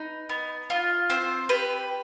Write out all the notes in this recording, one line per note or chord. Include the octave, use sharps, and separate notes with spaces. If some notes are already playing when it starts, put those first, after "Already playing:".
Already playing: D#4 B4
B3
F4
C4 C5
G4 B4